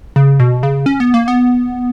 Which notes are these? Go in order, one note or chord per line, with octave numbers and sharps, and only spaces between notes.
C#3
B2
C#3
C#4
B3
A#3
B3